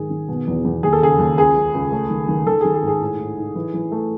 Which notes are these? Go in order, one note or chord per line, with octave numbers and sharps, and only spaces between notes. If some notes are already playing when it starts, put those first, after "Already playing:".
Already playing: G#2 D#3 G#4
D#3
B2
E2
E2
D#2 G#4
A4
C#3 G#4
D#2
C#2 G#4
C#3
C#2
A3
D#3
D#3
D#3 A4
D#3 G#4
G#4
G#2
G#4
A2
A2
D#4
E3
E3
A3